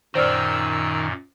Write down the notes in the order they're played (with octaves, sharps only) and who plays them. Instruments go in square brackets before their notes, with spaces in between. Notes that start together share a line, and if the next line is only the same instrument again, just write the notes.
[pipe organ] F#2 A#2 [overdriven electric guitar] D#3 [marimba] C5 D5 F6 [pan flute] E6